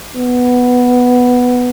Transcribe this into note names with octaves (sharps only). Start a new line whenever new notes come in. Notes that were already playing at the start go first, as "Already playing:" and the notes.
B3